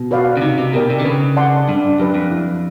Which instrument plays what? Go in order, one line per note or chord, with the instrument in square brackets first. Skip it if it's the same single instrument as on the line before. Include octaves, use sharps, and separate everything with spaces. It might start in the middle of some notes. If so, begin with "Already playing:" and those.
Already playing: [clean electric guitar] B2
[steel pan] F#4 B4 D5 F5
[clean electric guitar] C#3
[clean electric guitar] C3 [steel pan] D#4
[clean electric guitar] C3
[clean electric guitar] B2 [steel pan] G4 A#4 D5 G5
[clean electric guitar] C3
D3
[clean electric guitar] C#3 [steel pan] B4
[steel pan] D5 F#5 A5 C6
[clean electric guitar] G2 [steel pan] D4
[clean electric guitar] F#2 [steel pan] G4 B4
[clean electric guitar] F2
[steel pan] E4